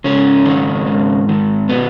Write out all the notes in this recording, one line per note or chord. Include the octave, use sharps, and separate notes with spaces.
G#2 C#3 C#4
D#3
G#2
D#3
B2 B3